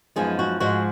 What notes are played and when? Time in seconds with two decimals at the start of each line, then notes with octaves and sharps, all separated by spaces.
0.16 F#2 F3 G#3 B3 D#4 G#4
0.39 F#4
0.60 G#2 F3 G#3 F#4